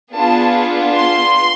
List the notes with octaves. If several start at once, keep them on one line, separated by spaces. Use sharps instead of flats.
B3 D4 F4 G#4 A5
C6